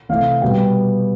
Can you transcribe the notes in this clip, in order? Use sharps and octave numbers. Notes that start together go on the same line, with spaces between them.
C3 E3 A3 F5
B2 G3 B3 G5